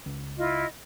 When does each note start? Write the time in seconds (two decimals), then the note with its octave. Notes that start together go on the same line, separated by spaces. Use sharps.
0.06 C#2
0.37 E4 F4 D#5